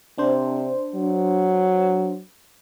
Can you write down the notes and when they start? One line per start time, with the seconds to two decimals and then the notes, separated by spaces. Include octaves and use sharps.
0.18 C3 D4 C5
0.95 F#3